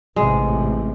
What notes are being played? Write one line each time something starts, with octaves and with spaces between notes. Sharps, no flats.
A1 G#2 C3 G#3